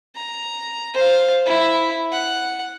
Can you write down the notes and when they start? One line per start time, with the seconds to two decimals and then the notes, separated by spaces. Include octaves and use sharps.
0.15 A#5
0.94 C5 F5
1.45 E4 E5
2.12 F#5